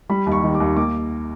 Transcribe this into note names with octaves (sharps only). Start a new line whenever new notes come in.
G3 B5
D#2
C#6
D#3
D6
D#2
A#3 D6